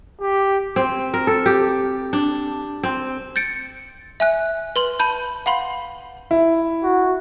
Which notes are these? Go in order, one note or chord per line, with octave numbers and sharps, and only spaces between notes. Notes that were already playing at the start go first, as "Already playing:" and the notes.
G4
C4
A#4
A4
G4
D4
C4
G6 A6 C#7 D7
E5 G#5 F#6
B4 C6 F#7
A5 B5 G6
F5 F#5 B5 C6
E4
F#4